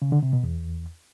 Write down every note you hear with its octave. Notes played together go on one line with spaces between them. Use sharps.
C#3
D3
C3
B2
E2